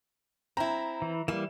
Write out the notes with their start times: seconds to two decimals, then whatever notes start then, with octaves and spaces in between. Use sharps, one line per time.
0.57 C4 E4 A#5
1.02 E3
1.28 E3 G3 A#3 E7